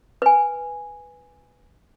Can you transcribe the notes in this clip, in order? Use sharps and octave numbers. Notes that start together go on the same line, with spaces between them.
B4 G#5